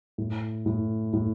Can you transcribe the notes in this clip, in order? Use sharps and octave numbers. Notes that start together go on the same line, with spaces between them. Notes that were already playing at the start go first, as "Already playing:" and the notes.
A2
A2
A2